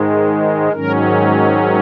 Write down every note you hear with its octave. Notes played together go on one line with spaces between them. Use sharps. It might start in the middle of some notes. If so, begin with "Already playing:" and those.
Already playing: G#2 D#3 G#3
G#2 D#3 F#3 C#4 A#4